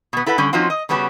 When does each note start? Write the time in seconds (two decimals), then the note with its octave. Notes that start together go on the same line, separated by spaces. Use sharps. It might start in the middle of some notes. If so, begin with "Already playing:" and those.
0.13 B2 B3
0.26 E4 A4 B4 F#5
0.38 D3 G3 C#4
0.53 F3 C4 C#4 D#4 F4 F#4
0.70 D#5
0.89 C#3 G3 B3 C#4 F#4